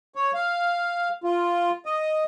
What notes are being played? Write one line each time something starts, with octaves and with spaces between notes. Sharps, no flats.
C#5
F5
F4
D#5